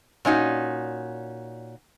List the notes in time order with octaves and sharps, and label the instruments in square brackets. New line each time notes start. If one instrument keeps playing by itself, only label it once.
[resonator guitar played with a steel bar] A#2 C#4 D#4 F#4